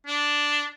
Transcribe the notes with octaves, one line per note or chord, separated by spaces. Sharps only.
D4